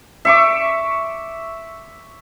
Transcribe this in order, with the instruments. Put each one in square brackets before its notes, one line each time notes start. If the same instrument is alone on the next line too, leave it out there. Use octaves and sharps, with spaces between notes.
[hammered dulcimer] E5 C#6 D6